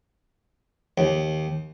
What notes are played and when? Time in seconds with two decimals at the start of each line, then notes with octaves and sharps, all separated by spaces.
0.98 D#2